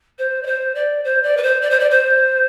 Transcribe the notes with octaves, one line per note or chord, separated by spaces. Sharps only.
C5
D5
C5
D5
C5
D5
B4
C5
D5
C5
D5
C5